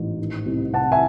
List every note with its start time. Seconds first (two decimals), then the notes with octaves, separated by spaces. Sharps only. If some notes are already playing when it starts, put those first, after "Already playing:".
Already playing: A1 G#2
0.18 D#3
0.46 C2
0.73 C3 F#5 A5
0.92 E5 G#5